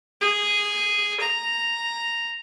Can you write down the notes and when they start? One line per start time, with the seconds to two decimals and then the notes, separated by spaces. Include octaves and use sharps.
0.21 G#4
1.20 A#5